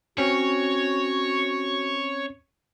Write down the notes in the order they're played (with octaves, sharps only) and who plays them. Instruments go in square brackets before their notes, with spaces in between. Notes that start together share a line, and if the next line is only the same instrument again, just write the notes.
[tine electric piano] C4 C#4 [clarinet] F#4 [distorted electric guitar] C#5